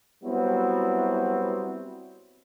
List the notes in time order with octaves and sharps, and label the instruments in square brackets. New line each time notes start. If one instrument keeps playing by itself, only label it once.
[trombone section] F#3 G3 B3 C4 E4 F#4